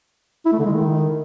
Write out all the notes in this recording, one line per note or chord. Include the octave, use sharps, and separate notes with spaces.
E4
A3
D3
G#3
D#3